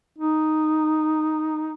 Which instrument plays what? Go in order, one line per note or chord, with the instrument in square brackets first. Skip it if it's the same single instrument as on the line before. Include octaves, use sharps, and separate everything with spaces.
[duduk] D#4